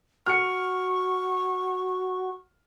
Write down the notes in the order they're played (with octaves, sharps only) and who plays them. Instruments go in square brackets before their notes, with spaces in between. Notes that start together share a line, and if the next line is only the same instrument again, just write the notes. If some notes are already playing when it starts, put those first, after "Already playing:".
[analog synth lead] F#4 [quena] C#6 [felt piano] F6 C#7